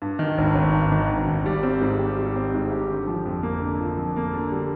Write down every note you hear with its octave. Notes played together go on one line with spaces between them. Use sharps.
G2
D#3
G#1
G#1
G2
D#3
G#1
G#1
G3
C4
G#2
G4
G3
C4
G#2
G4
D3
F3
F2
A#3
D3
F3
F2
A#3
D3
G3